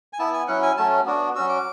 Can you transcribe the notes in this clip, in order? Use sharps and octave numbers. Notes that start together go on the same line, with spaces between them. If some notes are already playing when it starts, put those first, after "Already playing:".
G#5
B3 E4 A5
G#5
F#3 C#4 E4 F#5
G#5
F#3 A3 C#4 A5
B3 D4 F#4
F#3 C#4 F#4 E6
D6